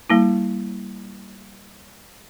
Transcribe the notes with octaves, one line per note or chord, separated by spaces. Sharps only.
G3 A#3 E4